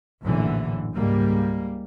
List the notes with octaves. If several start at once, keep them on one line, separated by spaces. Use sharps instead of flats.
A#1 F#2 A2 D3 E3
C#2 G#2 G3 A#3